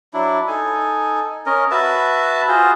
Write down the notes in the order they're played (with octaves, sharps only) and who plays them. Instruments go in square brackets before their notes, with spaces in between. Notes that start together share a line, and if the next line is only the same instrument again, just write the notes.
[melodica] F#3 D4 E4
D#4 A4 G#5
C#4 A#4 D#5
F#4 B4 E5 A5
F4 F#4 G#4 C5